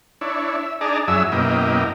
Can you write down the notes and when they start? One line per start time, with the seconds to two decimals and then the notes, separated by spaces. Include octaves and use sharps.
0.21 D4 E4 C#5
0.57 E5
0.81 D4 D#4 G#4 D5 A5 A#5
1.08 F#2 F#3 E4 G#4 E5 E6
1.32 F#2 B2 A#3 E4 G4 D#5